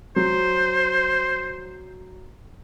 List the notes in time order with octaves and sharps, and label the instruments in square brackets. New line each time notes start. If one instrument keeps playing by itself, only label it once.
[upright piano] F#3 [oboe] C5